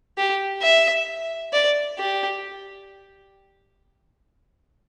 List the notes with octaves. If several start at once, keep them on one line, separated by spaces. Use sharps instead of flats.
G4
E5
D5
G4